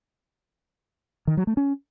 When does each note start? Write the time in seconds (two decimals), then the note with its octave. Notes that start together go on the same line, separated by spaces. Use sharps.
1.27 D#3
1.37 F#3
1.47 A3
1.57 C#4